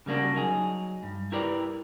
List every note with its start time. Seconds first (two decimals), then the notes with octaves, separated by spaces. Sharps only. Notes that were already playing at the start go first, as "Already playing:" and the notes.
0.06 C#3 G3 A#3 D4 F#4
0.35 F#3 D#4 G#4
1.03 G2
1.32 E4 G4 A#4 B4 D5